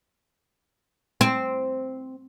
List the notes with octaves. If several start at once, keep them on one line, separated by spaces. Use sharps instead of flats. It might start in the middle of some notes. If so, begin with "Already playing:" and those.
C4